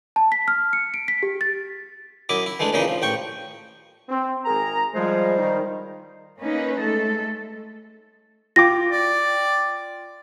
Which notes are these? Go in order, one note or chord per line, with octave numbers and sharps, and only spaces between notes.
A5
B6
F6
C#7
D7
B6
G4
A6
F#2 E4 D#5 D6
E4
E3 G#3 A3 D4
A#1 A#2 C#3 E3 D#4 D#5
F3
A1 G5 C#6
C4
G#1 G#4 A#4 A#5
F3 G3 G#3 C5
D#3
A#3 C#4 D#4 B4
G#3 A3 A4
F4 G5 D6 A#6
D5